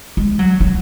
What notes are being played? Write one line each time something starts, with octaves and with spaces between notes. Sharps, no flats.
G#3
F#3
F#3